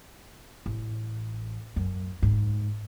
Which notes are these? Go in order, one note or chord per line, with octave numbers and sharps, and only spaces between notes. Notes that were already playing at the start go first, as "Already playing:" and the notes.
A1
F#2
G#2